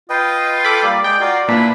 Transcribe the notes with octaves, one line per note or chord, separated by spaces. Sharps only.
F4 B4 D#5 G5
A4 B5 D6
G3 A#3 D5
G#3 G#4 G5
F4 F#4 A#4 D5
A#2 D4 E4 B4 B5